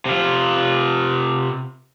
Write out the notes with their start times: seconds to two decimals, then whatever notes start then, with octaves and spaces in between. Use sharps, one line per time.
0.06 C3 F4